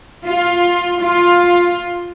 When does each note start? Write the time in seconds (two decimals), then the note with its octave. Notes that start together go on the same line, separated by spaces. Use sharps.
0.25 F4
1.00 F4